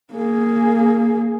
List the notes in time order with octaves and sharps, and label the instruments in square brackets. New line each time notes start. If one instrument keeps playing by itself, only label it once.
[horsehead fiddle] A#3 G#4